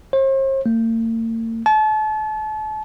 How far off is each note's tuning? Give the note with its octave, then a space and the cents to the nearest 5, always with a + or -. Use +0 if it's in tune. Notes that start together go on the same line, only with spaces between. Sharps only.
C5 +45
A#3 -45
A5 -35